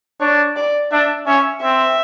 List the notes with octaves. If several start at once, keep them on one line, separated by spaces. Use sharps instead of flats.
D4 C#5
D5
D4 E5
C#4 E5
C4 E5